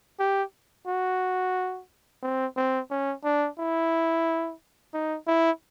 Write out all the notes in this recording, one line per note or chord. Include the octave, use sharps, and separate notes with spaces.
G4
F#4
C4
C4
C#4
D4
E4
D#4
E4